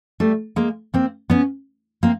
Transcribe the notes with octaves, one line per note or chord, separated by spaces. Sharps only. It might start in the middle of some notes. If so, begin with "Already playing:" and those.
G3 A3
G#3 A#3
A#3 C4
B3 C#4
A#3 C4